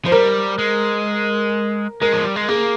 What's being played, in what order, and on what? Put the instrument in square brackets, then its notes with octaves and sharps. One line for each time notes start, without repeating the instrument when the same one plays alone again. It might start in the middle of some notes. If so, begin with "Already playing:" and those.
[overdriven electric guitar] F3 [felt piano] C5
[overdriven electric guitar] G3 [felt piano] A#4
[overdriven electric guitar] G#3
[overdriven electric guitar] G#3 [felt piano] A#4
[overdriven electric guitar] F3
G3
G#3
[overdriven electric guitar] A#3 [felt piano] G#4